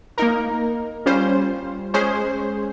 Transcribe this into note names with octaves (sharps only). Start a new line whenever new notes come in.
A#3 D#4 A#4
G3 C#4 F4 C5
G#3 C#4 G#4 C5